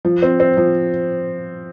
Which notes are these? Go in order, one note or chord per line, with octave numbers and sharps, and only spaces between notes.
F3
C4
C4
F3